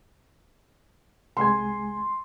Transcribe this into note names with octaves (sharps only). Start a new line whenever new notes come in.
C2 G#3 G#5 C6